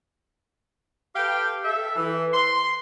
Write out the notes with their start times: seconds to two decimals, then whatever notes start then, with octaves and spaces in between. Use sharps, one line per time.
1.15 G4 A4 B4 F5 G5
1.64 A4 E5
1.96 E3
2.33 C6